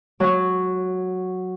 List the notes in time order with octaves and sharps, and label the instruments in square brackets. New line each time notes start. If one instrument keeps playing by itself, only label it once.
[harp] F#3